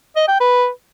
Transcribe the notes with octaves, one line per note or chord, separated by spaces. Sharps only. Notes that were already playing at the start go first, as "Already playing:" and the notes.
D#5
G5
B4